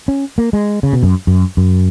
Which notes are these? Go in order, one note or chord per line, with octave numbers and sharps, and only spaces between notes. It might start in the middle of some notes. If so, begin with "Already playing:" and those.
C#4
A#3
G#3
C#3
B2
F#2
F#2
F#2